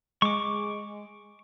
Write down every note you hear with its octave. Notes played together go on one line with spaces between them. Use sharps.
G#3 C#6 D6